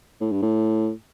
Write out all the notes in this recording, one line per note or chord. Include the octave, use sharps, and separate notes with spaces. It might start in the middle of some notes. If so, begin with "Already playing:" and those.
A2
G2
A2